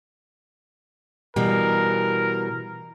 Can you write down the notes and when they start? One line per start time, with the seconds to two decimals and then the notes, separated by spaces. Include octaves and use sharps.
1.36 B2 E3 G3 A#4